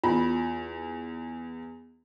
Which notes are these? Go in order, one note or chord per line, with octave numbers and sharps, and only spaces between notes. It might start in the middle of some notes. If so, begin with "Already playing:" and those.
E2 F4